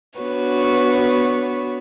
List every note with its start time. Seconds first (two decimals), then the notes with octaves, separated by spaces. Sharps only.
0.19 B3 D4 F#4 B4 C#5